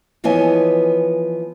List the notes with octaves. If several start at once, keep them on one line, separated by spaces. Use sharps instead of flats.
E3 F3 B3 C#5 D#5 G#5